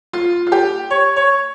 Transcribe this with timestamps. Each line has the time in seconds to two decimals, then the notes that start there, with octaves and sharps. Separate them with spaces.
0.13 F4
0.47 F4
0.52 G4
0.90 C#5
1.16 C#5